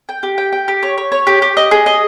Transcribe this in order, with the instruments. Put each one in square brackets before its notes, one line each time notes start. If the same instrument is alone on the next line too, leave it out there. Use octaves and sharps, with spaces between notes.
[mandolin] G5
G4
G5
G5
G4
C#5
C#5
C#5
G4
G4
D#5
G#4
D#5